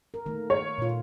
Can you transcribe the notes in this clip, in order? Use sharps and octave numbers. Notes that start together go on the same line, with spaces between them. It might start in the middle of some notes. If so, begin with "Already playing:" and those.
A#4
D#3 A3 A#3
C#5
A#2 F4